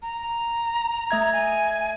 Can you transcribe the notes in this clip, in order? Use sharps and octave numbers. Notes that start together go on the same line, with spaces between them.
A#5
A3 E5 G#6
G#5